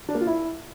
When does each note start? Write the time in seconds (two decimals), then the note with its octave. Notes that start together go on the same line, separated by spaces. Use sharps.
0.09 D4
0.15 A#3
0.21 F4
0.27 E4